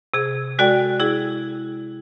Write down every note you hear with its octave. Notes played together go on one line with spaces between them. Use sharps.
C3 G#4
G#3 F#4 A4 D5 G5
E4 G#4